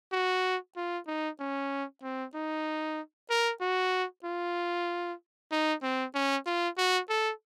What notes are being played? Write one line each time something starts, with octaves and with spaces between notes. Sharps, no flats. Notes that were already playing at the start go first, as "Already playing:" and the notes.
F#4
F4
D#4
C#4
C4
D#4
A#4
F#4
F4
D#4
C4
C#4
F4
F#4
A4